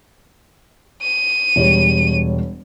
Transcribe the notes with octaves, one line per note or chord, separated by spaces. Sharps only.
D#7
E1 G3 C#5